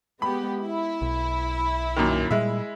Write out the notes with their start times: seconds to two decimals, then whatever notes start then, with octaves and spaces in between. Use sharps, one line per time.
0.22 G#3 B3 G4 B5
0.62 E4
1.02 B1
1.96 F#2 A#2 D#3
2.31 A#2 G3 G#3 E5